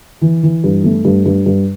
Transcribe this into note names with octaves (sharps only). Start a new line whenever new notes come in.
E3
E3
G2
A3
G2
G2
G2